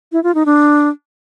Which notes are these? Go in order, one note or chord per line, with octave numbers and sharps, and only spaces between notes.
E4
F4
D#4
D4